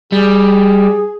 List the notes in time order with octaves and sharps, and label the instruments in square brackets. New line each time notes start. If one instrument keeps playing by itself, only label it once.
[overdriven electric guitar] G3 [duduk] G#4